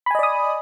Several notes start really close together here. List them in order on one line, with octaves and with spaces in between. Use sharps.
B5 G#5 D#5 D5 D#6